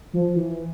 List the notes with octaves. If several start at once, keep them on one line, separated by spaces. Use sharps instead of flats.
F3
E3